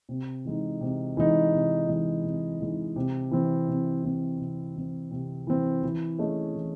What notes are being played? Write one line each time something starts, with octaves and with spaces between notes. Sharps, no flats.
C3
E3 G#3 D#4
C3
E3 G#3 D#4
C3
E3 G#3 D#4
C3
E3 G#3 D#4
C3
E3 C4
C3
E3 C4
C3
E3 C4
C3
E3 C4
E3
A3 C#4 G#4 D#5
E3